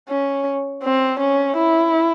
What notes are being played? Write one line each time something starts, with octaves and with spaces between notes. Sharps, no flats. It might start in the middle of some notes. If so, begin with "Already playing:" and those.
C#4
C4
C#4
E4